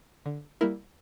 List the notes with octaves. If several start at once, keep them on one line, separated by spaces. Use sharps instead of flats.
D3
G3 A#3 E4 A#4